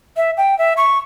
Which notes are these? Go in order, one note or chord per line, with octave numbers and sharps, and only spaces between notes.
E5
G5
E5
C#6